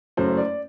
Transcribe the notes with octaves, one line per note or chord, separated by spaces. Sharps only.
F#1 F#2 F#3 A3 C5
D5